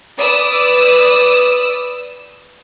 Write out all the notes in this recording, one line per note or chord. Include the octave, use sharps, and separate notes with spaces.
B4 D5 D#6 E6